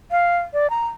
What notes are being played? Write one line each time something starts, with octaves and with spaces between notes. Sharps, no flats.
F5
D5
A#5